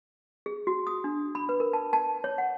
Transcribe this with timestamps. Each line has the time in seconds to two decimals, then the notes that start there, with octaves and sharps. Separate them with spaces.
0.46 G#4
0.67 F#4
0.87 D#6
1.04 D4
1.35 B5
1.49 B4
1.60 A#4
1.73 A5
1.93 A5
2.24 C#5
2.38 F#5